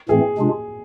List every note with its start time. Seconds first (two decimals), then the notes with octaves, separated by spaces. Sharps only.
0.09 A2 E3 A3 C4 G#4
0.38 C3 G#3 D4 F4